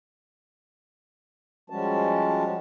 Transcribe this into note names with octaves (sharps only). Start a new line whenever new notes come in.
F3 G3 G#3 C#4 F#4 A5